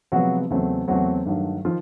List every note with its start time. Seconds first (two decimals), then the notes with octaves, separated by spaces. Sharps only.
0.12 C3 F3 F#3 G#3 B3 F#4
0.50 E2 C#3 F#3 A3 C4
0.88 E2 C#3 F#3 A3 C4 F#4
1.26 G2 D#3 F#3 A3
1.65 D#3 F3 F4